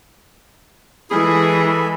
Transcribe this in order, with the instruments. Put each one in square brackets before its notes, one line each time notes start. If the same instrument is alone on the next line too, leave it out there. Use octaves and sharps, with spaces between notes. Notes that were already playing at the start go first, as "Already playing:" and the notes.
[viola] E3 G#3 [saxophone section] E4 G#4 [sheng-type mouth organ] A4 G#5 B5